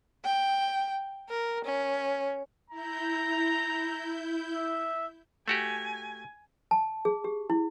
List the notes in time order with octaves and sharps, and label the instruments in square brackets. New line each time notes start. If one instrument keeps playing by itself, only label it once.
[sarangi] G5
A#4
C#4
[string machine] E4 G6 [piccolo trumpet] A#5
[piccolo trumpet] E5
[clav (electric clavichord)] A3 F#4 G4 [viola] G#5
[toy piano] A5
G#4
G4
E4